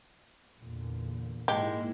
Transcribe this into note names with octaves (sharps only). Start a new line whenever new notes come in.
E2 A#2 D3
G#2 G#3 A#3 E4 G4